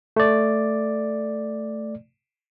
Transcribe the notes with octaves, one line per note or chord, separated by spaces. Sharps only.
A3 D5